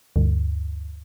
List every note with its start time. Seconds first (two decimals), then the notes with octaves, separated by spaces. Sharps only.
0.16 D2 G2